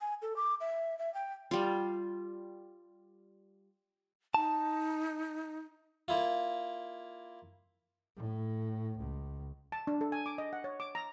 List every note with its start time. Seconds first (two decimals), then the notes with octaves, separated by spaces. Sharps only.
0.01 G#5
0.22 A4
0.36 D6
0.61 E5
0.99 E5
1.14 G5
1.51 G3 F4
4.34 D#4 A5
6.08 A#3 E4 F4
8.16 A2
8.99 C#2
9.72 A5
9.87 D4
10.01 A4
10.12 G#5
10.26 D6
10.38 D#5
10.53 F#5
10.64 C#5
10.80 D6
10.95 A#5